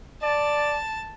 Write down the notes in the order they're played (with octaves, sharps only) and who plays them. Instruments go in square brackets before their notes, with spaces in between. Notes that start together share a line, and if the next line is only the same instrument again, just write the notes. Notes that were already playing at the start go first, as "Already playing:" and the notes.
[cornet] D5 [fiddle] A5